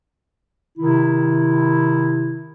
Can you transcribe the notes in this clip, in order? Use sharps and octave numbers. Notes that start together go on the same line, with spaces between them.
C3 D#3 E4